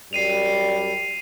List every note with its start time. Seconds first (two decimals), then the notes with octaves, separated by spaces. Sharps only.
0.13 F#2 G3 C7 D#7 F7